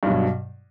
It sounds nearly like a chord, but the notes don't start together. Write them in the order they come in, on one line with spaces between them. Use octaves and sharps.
G2 B2 F#3